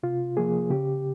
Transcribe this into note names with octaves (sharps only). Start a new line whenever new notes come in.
C3 F4
F3 A#3 G#4
C#3 G4